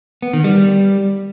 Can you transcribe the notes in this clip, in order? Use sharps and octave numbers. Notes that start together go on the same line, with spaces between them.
B3
D#3
G3